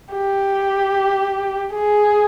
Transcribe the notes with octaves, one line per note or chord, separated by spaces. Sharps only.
G4
G#4